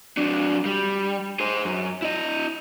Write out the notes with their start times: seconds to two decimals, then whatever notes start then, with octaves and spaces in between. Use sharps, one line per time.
0.17 F#3 D4
0.65 G3
1.40 G#4 C5
1.65 F#2
2.02 E4 D#5